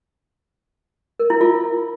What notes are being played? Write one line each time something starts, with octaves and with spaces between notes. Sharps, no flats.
A#4
E4
F4